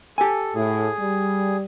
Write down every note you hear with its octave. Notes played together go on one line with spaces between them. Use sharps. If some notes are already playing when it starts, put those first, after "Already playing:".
G4 A4 G#5
A2 G#4
G3